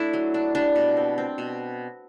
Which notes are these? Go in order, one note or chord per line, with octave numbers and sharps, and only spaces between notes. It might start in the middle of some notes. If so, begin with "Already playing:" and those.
Already playing: A3 D4 E4
F#3
D4
G3 D4
B2
C4
C4
B2